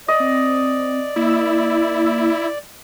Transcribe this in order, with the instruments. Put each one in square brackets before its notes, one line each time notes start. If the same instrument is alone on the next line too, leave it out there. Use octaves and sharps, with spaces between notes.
[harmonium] D5 [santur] D#5
[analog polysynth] C4
[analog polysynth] A#3 E6 [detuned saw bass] E4